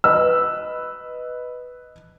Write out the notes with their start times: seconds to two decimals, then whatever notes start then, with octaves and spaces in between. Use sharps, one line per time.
0.04 B4 D#5 E6